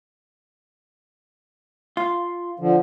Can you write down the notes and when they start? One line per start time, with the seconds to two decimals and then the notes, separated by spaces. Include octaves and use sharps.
1.97 F4
2.60 D3 F3